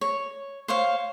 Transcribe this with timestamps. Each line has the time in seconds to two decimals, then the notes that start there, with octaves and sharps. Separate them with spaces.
0.01 C#5
0.68 C5 C#5 F5